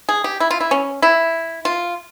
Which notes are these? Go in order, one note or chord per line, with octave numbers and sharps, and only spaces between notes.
G#4
G4
E4
F4
E4
C#4
E4
F4